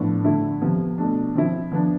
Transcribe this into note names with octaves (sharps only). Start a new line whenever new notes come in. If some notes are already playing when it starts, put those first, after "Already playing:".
Already playing: A2 F3 B3 D4
D3 A3 E4
C3 F3 B3
B2 A3 D4
F3 C4 E4
F3 B3 D4